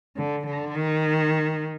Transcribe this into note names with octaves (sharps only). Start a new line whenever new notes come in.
D3
D3
D#3